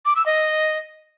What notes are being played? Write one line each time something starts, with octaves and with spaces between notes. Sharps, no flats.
D6
E6
D#5